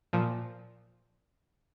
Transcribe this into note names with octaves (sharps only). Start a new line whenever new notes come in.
A#2 F3